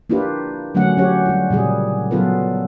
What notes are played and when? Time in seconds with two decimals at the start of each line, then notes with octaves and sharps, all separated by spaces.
0.10 A#3 D4 E4 F4 G4 B4
0.75 D3 F#3 A3 C#4 F#5
0.97 F#3 C#4 G4 C#5
1.26 G3 F4
1.50 A#2 C#3 G3 G#4
2.11 F#3 B3 F4 A4 B4